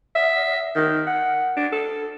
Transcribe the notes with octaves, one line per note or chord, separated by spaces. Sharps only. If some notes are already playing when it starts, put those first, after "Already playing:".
E5
D#3
F#5
D4
A4